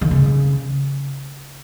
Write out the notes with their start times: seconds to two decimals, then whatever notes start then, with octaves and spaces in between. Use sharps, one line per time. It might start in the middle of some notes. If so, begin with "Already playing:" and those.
0.01 D#3
0.11 C#3